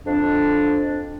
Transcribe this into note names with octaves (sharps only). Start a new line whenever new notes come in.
F2 D4